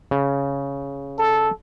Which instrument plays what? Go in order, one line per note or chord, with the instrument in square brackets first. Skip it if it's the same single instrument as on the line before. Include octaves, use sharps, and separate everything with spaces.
[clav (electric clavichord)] C#3
[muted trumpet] A4